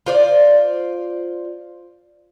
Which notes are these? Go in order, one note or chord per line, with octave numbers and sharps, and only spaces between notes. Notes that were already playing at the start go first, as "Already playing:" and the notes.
F4 C5 D5